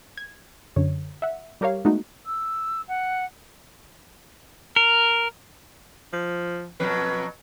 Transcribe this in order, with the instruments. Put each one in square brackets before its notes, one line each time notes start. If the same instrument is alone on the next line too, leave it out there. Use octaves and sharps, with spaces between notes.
[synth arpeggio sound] G#6
F#2 D3 C#5
E5 F#5
G3 G4 A#4 C#5 F5
G#3 A3 B3 D#4 F#4
[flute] E6
F#5
[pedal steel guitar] A#4
[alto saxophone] F3
[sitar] F2 B2 F#3 [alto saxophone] B4